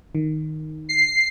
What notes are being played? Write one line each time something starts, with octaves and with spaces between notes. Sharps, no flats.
D#3
C7